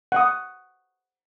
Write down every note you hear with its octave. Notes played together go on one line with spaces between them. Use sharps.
F#5 D#6